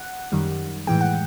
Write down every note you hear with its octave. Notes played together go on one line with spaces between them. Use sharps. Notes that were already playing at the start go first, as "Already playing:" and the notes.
Already playing: F#5
F#2 D#3 G3
A2 E3 G#3 G5
F#5